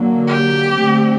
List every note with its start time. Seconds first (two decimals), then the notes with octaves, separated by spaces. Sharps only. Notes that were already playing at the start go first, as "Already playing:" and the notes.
Already playing: D3 F#3 A#3
0.27 G4
0.70 D3 A3 C4